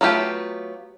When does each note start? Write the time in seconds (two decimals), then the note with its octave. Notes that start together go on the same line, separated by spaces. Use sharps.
0.01 F#3 A3 B3 F4 G4